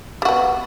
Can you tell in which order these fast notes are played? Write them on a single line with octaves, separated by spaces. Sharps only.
G3 F#4 B3